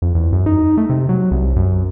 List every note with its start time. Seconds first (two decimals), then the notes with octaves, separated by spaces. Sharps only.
0.02 F2
0.15 E2
0.33 F#2
0.46 D#4
0.77 A3
0.90 C3
1.09 F#3
1.31 C2
1.56 F#2